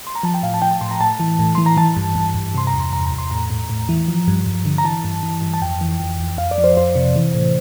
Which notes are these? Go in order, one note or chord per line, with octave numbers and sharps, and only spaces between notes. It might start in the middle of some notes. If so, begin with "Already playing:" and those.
C6
A#5
F3 A5
G5
A2 F5
A5
F3 G5
A5
A2 C6
A#5
A2 A5
E3
A2
E3 C6
A#5
E3 A5
G2
G2
G2
C3 C6
A#5
E2
C6
E2 A#5
A#5
E2
C6
A2 A#5
A2
A2
E3
F3
G2
G2
D3
A#5
E3 A5
G2
E3
G2
A5
F2 G5
E3
F2
F2
F2 F5
D5
F3
C5
F2 C5
C3
E3
A2